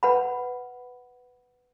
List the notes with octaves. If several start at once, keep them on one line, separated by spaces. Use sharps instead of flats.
B4 F#5 B5